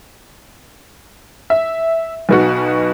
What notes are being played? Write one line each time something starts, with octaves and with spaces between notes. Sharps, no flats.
E5
B1 B2 F#4